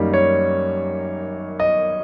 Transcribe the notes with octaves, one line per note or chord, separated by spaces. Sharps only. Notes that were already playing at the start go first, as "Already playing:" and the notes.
Already playing: F#2 D#3 G3 A#3 D#4
C#5
D#5